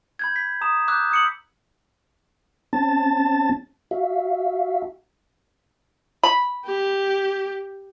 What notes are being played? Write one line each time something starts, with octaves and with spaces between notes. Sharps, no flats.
B5 G6 G#6
B6
A#5 D#6 E7
D6 E6 F#6 G6
D#6 C#7 F#7
C4 C#4 A5 A6
F#4 E5 F5
B5
G4